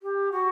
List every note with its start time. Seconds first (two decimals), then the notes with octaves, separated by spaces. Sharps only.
0.02 G4
0.32 F#4